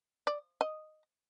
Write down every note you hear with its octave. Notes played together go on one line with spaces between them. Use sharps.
D5
D#5